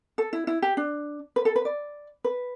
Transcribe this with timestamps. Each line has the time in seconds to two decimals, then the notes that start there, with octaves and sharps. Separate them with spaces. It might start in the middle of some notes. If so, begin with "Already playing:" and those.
0.18 A4
0.33 E4
0.47 E4
0.62 G4
0.77 D4
1.36 B4
1.45 A4
1.56 B4
1.65 D5
2.24 B4